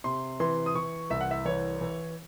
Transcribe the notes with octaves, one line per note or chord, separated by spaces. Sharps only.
C3 C6
E3 C6
D#6
E3 C#6
C2 E5
F#5
E5
E3 C#5
E3